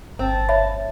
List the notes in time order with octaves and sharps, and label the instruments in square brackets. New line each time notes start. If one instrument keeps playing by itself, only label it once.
[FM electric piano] G1 [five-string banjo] C4 [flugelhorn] A5
[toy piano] C#5 E5 B5